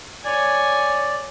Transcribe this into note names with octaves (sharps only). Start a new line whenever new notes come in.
C#5 D5 G#5